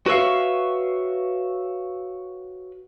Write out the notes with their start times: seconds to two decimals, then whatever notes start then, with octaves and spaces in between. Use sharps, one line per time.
0.06 F#4 B4 C#5 E5 F5